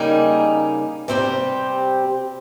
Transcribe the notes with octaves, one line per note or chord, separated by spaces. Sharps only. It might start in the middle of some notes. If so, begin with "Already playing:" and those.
Already playing: C#3 G3 A#3 D#4 G#4
C3 G3 C4 G4